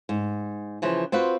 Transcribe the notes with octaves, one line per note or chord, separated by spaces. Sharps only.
G#2
C#3 E3 F3
C4 F4 F#4 B4